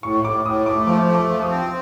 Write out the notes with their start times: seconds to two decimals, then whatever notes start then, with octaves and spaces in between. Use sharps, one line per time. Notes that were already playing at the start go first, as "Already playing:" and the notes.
0.03 A2 C#6
0.24 A2 D6
0.45 A2 D#6
0.66 A3 D6
0.87 F3 D6
1.08 A3
1.15 D6
1.29 F3
1.42 D#6
1.50 C4